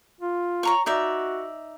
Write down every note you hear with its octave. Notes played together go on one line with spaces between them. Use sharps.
F4
C#5 A#5 C#6
D#4 F#4 D5 E5